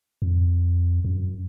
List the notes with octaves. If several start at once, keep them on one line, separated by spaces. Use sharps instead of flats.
F2
F2
F#2